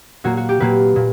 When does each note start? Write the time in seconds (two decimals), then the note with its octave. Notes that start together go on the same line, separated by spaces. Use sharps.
0.24 A#2 F#3 A#3 F#4
0.37 F#4
0.49 G4
0.60 A#2 F#3 A#3 B4
0.96 A#2